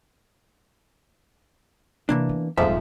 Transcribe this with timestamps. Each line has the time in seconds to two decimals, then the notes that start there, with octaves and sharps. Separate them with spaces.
2.09 C3 E3 A#3 D4
2.29 B3
2.57 D#1 F2 G#2 F3 G3 E5